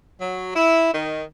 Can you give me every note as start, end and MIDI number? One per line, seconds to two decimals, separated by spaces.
0.20 0.54 54
0.54 0.91 64
0.93 1.22 51